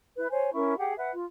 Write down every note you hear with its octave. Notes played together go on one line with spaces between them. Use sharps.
E4 B4
C5 C#5 G#5
C#4 E4 A#4 C#6
G4 G#4 F#5 G5
B4 E5 F#5
F4